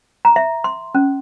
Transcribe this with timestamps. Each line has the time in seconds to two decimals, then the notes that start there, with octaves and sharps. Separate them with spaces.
0.25 A#5
0.36 E5
0.64 C6
0.95 C#4